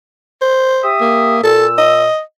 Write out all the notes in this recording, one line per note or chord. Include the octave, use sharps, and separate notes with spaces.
C5
G4 E5 D#6
A#3
A#2 A4 E6
D#5